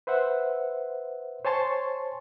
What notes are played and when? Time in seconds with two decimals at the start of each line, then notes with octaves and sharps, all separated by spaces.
0.07 B4 C5 E5 F#5
1.45 C5 C#5 G#5 A5 C6 C#6